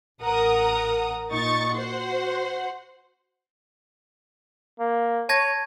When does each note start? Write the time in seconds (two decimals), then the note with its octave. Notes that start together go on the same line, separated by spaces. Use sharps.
0.22 A1 A#4 F#5 A#5 D#6
1.31 A#2 D#4 C#6 A6 C#7
1.75 F#4 C5 F#5 C6
4.80 A#3
5.29 C#5 A5 G#6 A#6